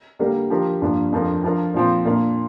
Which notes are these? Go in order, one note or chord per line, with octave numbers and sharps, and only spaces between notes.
D3 G3 A#3 G4 A#4
F3 D4 G4 A#4
G2 F3 A#3 D4
F2 F3 D4 A#4
F3 D4 F4 A#4
A#2 F3 C4
A#2 A#3 D4